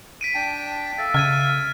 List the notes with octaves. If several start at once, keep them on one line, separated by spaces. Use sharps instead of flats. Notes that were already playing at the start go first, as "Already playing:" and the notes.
B6 D7 D#7
D4 G5 A5
A4 E5 F5 A6
C#3 F6 G#6 D#7